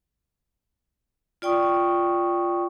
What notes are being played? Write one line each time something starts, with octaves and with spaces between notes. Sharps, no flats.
F4 D5 G5 C#6 D#6